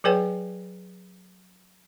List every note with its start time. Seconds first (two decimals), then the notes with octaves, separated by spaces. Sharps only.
0.04 F#3 G#4 B4 C#5 G5 G#5